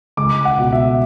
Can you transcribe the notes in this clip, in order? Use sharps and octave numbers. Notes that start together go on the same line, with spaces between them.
C#2 D6
F#5
B2
E5